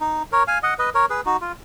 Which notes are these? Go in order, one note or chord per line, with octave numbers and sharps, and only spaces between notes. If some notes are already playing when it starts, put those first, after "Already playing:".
D#4
A#4 C#5
F5 G#5
D#5 F#5
B4 D#5
A#4 C#5
G#4 B4
D#4 F#4
F4